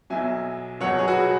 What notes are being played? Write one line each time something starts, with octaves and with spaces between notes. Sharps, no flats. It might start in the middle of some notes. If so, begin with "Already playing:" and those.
B1 B2 F#3 E5 G#5
E1 E2 B2 F#3 C#5 F#5
G#4 C#5
F#4 B4